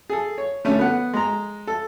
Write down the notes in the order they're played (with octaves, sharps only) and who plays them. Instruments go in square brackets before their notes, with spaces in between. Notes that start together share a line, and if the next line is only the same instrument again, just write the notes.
[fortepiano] G#4 A4
C#5
D3 A3 C#4
B3 F#5
G#3 A#5
A4